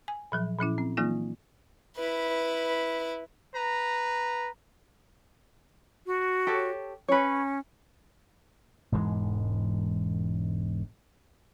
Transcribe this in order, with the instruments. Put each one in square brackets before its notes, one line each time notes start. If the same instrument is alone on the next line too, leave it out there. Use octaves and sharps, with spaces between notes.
[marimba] G#5
A#2 F3 F#3
A#2 F3 C#4 E4
C4
E3 F#3 A#3 D#4 F4
[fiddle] E4 B4
[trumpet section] B4 A#5
[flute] F#4
[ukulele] G4 A4 C#5
[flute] C#4 [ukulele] B4 C#5
[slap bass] E1 G#2 E3 G#3